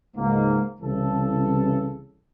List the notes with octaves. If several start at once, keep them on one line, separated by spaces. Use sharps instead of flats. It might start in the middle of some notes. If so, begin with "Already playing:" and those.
C#2 G#2 G#3 A#3
C2 C#3 E3 A4